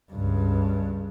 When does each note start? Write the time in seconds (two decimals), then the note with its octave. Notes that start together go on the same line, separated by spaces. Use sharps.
0.11 C#2 G2